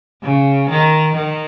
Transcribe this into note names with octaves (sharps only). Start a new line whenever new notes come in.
C#3
D#3
D#3